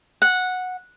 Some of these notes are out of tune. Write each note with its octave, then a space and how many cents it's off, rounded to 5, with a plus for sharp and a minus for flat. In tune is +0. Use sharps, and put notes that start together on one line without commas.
F#5 -10